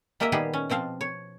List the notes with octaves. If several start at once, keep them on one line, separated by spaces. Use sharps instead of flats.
G#3 A#3 G4 A#4 D#5 E5
A#2 D#3 G3 B3 G4 G#4
C#4
B2 F3 C4 F5
C#5